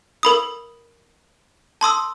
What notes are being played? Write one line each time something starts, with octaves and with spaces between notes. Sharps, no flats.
A#4 B5 D#6
A5 C6 D#6 E6